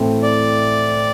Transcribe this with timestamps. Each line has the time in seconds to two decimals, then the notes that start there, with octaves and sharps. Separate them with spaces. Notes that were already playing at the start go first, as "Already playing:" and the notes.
Already playing: A2 E3 A3 C4 E4
0.22 D5